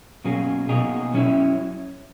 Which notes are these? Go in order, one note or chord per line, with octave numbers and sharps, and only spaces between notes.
B2 F#3 A#3 C#4 G#4
B2 A#3 D#4 G#4
F#3 C#4 E4